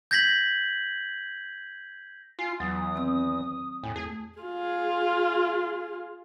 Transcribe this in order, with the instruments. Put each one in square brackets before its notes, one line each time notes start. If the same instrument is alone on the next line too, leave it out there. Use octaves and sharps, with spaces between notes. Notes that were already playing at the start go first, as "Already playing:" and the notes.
[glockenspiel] G6 G#6 A#6 B6 F#7
[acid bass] F4 [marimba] G#5 [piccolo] C7
[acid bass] E2 [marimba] F#3 [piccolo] D#6
[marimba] D#3 C4 E6
[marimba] E2 [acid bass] A2
[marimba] A3 [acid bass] G#4
[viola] F4 G#4